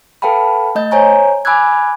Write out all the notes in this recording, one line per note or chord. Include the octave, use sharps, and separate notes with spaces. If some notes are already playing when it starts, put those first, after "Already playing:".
A4 B4 F5 G5 A5 B5
A3 D#5 G6
C5 C#5 G#5 A#5 G6
G#5 B5 D6 E6 F#6 G#6